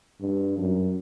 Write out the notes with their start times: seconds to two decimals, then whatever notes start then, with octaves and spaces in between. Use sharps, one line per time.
0.20 G2
0.58 F#2